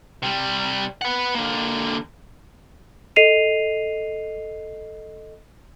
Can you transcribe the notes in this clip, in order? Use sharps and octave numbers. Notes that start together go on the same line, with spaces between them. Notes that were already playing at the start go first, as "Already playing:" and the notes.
C3 G3
B4 F#5
D3 A#3
A4 D#5 C7 D#7 F7